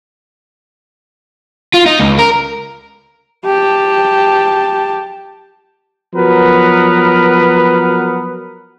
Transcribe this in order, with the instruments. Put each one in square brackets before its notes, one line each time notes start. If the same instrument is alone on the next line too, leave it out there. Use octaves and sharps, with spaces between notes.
[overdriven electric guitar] F4
D#4
C#2
A#4
[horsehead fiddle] G4 A5
[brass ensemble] F3 F#3 B3 A#4 B4